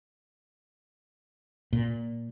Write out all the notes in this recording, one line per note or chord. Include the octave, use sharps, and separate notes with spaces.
A#2